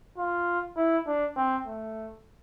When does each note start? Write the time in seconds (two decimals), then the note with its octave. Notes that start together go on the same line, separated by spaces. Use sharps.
0.17 F4
0.76 E4
1.07 D4
1.36 C4
1.66 A3